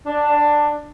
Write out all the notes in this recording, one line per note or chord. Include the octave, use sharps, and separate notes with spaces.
D4